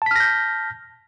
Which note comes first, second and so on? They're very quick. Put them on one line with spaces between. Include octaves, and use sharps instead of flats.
A5 B6 F6 A#6 G6